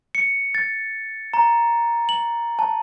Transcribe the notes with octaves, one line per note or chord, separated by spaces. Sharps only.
C#7
A6
A#5
F#7
A5